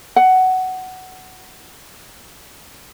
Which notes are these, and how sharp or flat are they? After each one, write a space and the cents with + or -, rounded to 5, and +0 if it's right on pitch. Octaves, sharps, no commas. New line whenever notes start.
F#5 +10